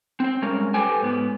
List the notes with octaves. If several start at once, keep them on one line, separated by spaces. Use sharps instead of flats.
C4 C5
G3 G#3 C#4 A#4
G4 A4 B4 C5 G5 G#5
G#2 B3